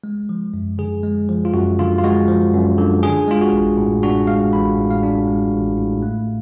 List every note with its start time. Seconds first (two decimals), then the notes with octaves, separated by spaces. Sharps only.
0.04 G#3
0.29 F3
0.54 F#2
0.78 D3 G#4
1.04 G#3
1.29 F3
1.45 F4
1.54 F#2 F#4
1.79 D3 F4
1.98 F4
2.04 G#3 F#4
2.28 F3
2.54 F#2
2.78 D3
3.03 D4 G#4
3.28 G#3 F4
3.41 F#4
3.53 A1
3.78 A2
4.03 D4 F#4
4.27 G#3 F5
4.52 A1 B5
4.78 A2
4.90 F5
5.03 D4
5.27 G#3
5.52 A1
5.78 A2
6.03 A3